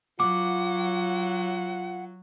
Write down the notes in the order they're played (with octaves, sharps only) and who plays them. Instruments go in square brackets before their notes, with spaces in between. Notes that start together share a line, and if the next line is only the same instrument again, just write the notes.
[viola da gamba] F#3 [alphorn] F4 [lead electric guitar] F#5 [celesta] D6